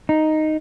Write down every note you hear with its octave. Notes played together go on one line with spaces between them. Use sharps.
D#4